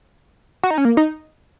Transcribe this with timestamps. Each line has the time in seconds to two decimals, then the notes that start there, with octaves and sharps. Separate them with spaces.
0.63 F#4
0.71 D#4
0.78 C#4
0.85 A#3
0.97 D#4